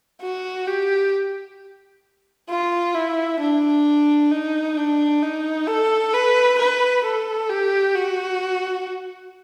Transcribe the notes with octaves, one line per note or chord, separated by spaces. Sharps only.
F#4
G4
F4
E4
D4
D#4
D4
D#4
A4
B4
B4
A4
G4
F#4